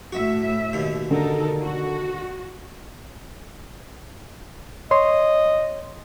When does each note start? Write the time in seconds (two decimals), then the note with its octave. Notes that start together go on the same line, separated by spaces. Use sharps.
0.12 A2 A3 F#4 E5
0.73 D#2 B2
1.11 D3 D#4 A4 A#4
1.63 F#4
4.91 C#5 D#5 C6